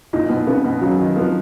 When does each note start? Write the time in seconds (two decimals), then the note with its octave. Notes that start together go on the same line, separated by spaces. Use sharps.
0.13 A#2 D#4
0.29 B2
0.47 C#3 B3
0.65 B2
0.81 C#3 F#3
0.99 D#3
1.16 F3 B3